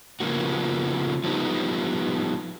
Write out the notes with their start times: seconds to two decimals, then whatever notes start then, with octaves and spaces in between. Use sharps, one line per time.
0.20 C#3 F3 A#3 B3 F#4
1.24 F3 G3 B3 D#4